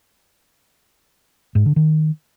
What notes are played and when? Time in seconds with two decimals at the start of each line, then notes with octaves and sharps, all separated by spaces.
1.55 G#2
1.66 D3
1.76 D#3